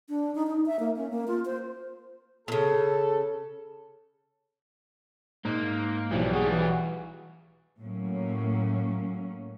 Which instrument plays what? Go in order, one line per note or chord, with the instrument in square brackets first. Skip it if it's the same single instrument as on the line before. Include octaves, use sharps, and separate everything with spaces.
[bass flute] D4
D#4
D#4
E5
A#3
C#4
A#3
F4
C5
[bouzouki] A#2 C#3 [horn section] A4
[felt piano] G#2 [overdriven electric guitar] A#3
[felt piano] B1 [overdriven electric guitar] E3 G3 [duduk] F3
[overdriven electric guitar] G3 F#4 [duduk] G#4
[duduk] E3
[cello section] A2 F#3 A#3 C#4